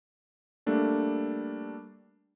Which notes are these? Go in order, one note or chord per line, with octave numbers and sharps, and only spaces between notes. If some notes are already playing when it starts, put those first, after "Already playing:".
G3 A3 A#3 D4 A4